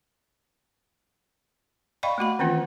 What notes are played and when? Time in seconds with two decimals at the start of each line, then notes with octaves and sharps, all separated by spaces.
2.03 D5 D#5 F5 G5 B5 C#6
2.18 A3 A#3 F#4 B5
2.39 D#3 E3 A#3 C4 C#4 F4